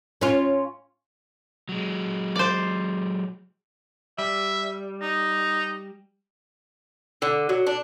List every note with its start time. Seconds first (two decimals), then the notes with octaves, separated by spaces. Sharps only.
0.21 C#4 F4
1.69 F#3 G#3
2.36 C5 D5
4.19 G3 E5
5.02 D#4
7.22 D3
7.49 F#3
7.67 D4